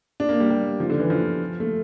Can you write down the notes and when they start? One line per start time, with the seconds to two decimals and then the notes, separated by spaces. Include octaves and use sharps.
0.20 D4
0.29 A#3
0.40 G3
0.50 G3
0.80 F3
0.90 D3
1.00 E3
1.10 F3
1.60 A3